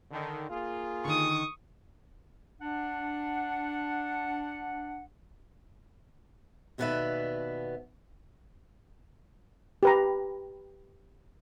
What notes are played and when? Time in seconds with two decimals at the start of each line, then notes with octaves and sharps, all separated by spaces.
0.11 D3 D#3
0.50 A#3 F4 G#4
1.05 D3 D#3 C#6 D#6
2.61 D4 F#5
6.78 D#2 B2 B3 B4 D5 E5
9.83 G4 B4 A#5